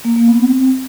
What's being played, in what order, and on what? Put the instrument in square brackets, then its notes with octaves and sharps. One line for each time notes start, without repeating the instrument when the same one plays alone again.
[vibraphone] A#3
A#3
B3
C4
C4